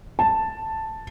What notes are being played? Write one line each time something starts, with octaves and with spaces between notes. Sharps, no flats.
A5